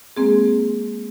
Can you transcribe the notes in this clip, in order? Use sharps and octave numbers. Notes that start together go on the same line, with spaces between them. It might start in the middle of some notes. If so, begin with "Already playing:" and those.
G#3 A#3 C4 G#4